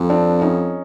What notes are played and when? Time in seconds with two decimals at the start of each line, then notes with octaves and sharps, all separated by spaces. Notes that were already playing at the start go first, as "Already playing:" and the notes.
Already playing: F2
0.10 C4 D4
0.42 C#4 D#4